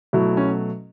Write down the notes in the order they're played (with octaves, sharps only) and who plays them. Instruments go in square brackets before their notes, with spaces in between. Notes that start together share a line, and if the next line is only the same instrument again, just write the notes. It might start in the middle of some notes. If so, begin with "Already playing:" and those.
[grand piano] B2 F#3 A3 E4
C#4